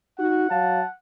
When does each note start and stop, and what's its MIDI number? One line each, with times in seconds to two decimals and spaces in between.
0.19 0.50 63
0.19 0.50 66
0.19 0.93 78
0.50 0.82 54
0.50 0.80 77
0.50 0.87 81